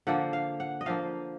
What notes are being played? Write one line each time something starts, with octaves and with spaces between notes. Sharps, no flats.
D3 F3 A#3 F#5
F5
F#5
D#5
D3 F3 A#3 F5